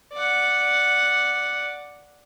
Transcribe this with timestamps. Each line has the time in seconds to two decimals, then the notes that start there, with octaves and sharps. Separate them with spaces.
0.13 D5 F#5